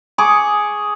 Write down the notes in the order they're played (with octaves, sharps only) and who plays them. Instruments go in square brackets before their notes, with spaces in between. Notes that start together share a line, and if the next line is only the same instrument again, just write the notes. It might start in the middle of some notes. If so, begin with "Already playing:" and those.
[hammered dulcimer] G#4 C#6 D6